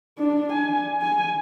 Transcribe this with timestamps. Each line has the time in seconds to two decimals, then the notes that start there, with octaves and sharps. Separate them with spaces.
0.18 D4
0.53 G#5
1.02 G#5